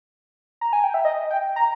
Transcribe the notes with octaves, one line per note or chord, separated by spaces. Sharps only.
A#5
G#5
G5
E5
D#5
G5
A#5